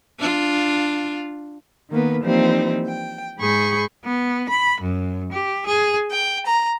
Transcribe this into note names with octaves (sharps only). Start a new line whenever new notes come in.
D4 F4
D#3 A#3 B3 B4
E3 F3 G3 A#3 C4 D#4
G5
G#2 G#3 G#4 B5 C#6 G6
B3
B5
F#2
G4
G#4
G5
A#5